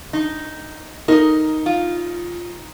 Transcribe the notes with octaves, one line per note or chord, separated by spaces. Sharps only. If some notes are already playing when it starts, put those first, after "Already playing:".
D#4
D#4 A#4 D#5
F4